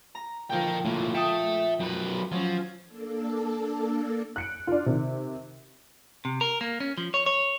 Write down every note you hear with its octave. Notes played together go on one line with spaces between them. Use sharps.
A#5
A#2 D3 F3 A#4 G5
A2 A#3
E5 G5 A5 D#6
F#2 B4
F3 F#3 C#4
A#3 D4 A4
F#6 C#7 D7
D4 F4
C3 D#3
C3
A#4
A#3
C#4
F3
C#5
C#5